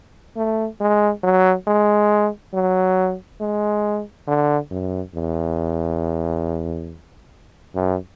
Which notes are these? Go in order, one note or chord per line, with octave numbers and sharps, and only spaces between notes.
A3
G#3
F#3
G#3
F#3
G#3
D3
F#2
E2
F#2